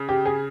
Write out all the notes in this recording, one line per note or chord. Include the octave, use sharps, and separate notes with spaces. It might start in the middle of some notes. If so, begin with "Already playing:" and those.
Already playing: C#3
G4
G#4